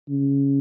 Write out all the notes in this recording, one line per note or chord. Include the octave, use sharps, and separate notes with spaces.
C#3